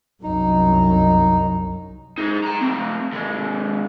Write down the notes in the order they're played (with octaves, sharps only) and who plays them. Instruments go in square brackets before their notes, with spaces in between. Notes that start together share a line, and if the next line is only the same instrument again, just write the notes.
[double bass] C2 F#2 [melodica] D#4
[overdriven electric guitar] D#4 G#4
G5 A#5
A3 C4
D#2 G#3